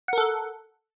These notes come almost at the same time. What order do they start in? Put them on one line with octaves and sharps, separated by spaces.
F#5 A#4 A4